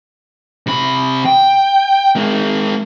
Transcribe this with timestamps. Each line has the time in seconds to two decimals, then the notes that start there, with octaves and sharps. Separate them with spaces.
0.67 C3 B5
1.25 G5
2.15 G#3 A#4